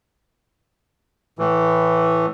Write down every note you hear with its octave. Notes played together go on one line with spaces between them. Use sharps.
A2 E3